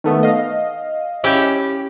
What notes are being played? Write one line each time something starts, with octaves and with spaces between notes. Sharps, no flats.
D#3 A3 B3
D#5 F5
C#4 E4 G4